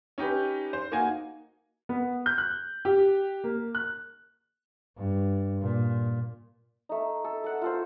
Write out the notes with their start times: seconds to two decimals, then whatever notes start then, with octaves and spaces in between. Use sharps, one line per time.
0.18 C#4 D#4 G4 B4
0.73 C5
0.92 A#3 D#4 F#4 G#5
1.89 B3
2.26 G6
2.38 F#6
2.85 G4
3.44 A#3
3.75 F#6
4.97 G2
5.61 A#2
6.89 A3 D#4
7.24 A4
7.44 A4 F#5 E6
7.62 F4 A4 C5